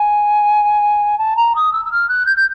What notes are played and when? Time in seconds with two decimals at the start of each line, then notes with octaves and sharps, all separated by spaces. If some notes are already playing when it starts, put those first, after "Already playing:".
Already playing: G#5
1.18 A5
1.37 A#5
1.55 D#6
1.72 E6
1.85 E6
1.91 F6
2.08 F#6
2.26 G6
2.36 G6